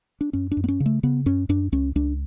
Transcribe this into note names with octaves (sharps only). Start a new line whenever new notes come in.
D4
F#2 C#4
D4
F#2
B3
C#4
C#3
A3
C#3 B3
F#2 C#4
F#2 D4
C#2 C#4
C#2 D4